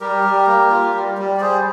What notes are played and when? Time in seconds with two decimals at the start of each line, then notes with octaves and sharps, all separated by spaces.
0.01 G3 G4 A#4
0.24 G3
0.47 A#3
0.70 F4
0.94 G3
1.18 G3
1.37 D5
1.41 G3 G#4 C5